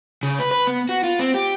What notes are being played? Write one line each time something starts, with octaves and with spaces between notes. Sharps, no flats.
C#3
B4
B4
B3
F#4
F4
C4
G4